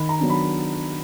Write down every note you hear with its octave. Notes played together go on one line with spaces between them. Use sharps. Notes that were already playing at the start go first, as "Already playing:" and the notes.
Already playing: D#3 B5
A#5
F#3 B3 D4
B5